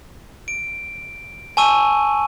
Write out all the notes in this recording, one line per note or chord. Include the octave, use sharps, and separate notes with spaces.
D7
G#5 A5 C#6 E6 D#7